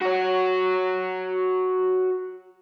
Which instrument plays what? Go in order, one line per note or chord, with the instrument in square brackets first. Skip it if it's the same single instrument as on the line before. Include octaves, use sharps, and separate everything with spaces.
[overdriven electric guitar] F#4 C#5